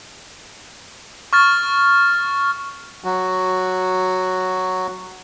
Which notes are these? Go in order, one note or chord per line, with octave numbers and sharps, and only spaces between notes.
C#6 F6 A6
F#3 F#4